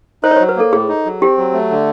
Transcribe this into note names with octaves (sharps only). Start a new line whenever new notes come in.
D#4 C5
C#5
F#3 C5
B4
A#3 A4
A2 G#4
D#4
F#3
C4 G4
F#3
A3
D3